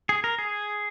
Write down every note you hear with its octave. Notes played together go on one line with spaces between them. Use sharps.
G#4
A#4
G#4